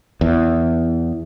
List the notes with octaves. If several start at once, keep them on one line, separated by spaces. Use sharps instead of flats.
E2